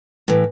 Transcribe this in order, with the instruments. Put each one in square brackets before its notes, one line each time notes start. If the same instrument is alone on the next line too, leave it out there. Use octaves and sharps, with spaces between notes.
[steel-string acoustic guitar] A2 E3